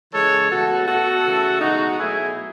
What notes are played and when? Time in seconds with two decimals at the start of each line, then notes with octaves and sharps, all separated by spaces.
0.13 C#3 E3 G#3 A4 C#5
0.51 B2 A3 F#4 A4
0.87 B2 A3 F#4 A4
1.24 C#3 E3 A3
1.61 B2 G#3 D#4 F#4
1.98 B2 F#3 A3 E4 G#4